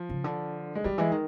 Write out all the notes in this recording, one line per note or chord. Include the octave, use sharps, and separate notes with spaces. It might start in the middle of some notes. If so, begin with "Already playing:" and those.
Already playing: F3
C#3
D3
G#3
D#3 G3
E3 G#3
D#3